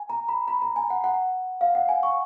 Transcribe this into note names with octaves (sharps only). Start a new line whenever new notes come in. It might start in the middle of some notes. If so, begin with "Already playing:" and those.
Already playing: G#5
A#5
B5
B5
A#5
G#5
F#5
F#5
F5
F#5
G#5
C#6